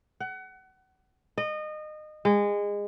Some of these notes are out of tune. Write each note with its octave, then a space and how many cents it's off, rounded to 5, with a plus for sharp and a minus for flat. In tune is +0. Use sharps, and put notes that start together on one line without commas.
F#5 +30
D#5 -25
G#3 -25